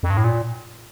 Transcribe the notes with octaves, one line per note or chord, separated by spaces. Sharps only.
F2
G2
A2
A#2